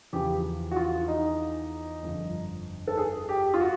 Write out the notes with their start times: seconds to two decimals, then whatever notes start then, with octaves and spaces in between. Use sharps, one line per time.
0.13 E2 C#3 F3 G4
0.71 F#4
0.76 F4
1.08 D#4
2.03 G1 F2 D3 F3
2.87 A4
2.97 G#4
3.29 G4
3.54 F4
3.60 F#4